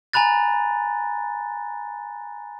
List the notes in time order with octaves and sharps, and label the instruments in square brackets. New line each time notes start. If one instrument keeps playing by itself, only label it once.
[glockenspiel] G#5 A#5 B5 F#6 A6